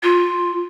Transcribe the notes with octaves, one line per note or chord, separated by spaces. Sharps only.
F4